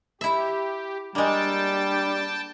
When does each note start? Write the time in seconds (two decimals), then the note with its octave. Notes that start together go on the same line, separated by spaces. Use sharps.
0.21 E4 G4 E5
1.15 G3 G#3 A#3 D4 G5 A5